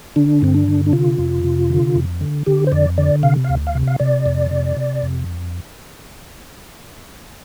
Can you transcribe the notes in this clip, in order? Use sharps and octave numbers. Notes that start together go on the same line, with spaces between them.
D3 D4
G2 C4
D4
D3
D4
C3 F4
F2
C3
D3
F2
D3
D3 G4
C5
F2 D5
D3 D5
C3 F5
D2 F5
F5
C3
F5
C3 D5
F2
C3
C3
F2